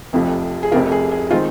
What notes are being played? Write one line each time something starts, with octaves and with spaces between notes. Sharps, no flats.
F1 F2 C3 F3
G#4
F1 F2 C3 F3 F4 A#4
G#4
G#4
D#3 G#3 C4 D#4 F4